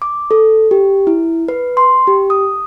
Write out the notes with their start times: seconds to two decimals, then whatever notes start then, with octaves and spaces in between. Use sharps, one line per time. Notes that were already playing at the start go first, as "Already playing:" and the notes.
0.02 D6
0.31 A4
0.71 G4
1.07 E4
1.48 B4
1.77 C6
2.07 G4
2.30 D#6